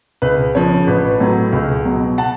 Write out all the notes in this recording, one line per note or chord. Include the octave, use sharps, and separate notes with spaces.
C#2 B4
C#3 F3 C#5
A1 B4
A2 F#3
C#2
B2 F#3
F#5 A5